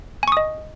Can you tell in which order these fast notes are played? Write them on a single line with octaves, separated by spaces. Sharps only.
G#5 C#6 D#6 D#5